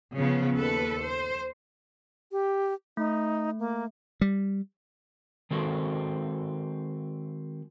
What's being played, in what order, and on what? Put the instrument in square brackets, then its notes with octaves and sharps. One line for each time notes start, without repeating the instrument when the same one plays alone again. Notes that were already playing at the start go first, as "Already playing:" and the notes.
[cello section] C#3 F3 B3
D#2 A4 B4
C5
[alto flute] G4
[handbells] A3 [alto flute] D#4
[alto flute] A#3
[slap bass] G3
[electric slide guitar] D#3 G#3 C4 F#4 A4